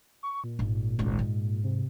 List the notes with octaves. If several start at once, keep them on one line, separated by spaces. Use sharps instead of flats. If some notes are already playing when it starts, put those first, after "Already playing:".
C#6
A#2
G#1 G#2
G#1 C#2
G#2
C3